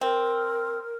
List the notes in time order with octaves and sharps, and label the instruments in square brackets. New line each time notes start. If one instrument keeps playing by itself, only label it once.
[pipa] C4 [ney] A#4